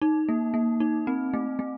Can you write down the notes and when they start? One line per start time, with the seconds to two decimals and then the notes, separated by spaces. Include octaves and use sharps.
0.02 D#4
0.29 A#3
0.54 A#3
0.80 D#4
1.07 C4
1.34 A3
1.59 A3